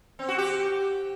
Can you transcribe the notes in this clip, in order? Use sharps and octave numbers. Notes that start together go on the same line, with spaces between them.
C4
F#4
G4